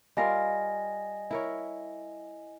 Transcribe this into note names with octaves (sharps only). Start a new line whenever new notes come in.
G3 F4 A#4 D#5 G#5 A#6
E4 A#4 C#5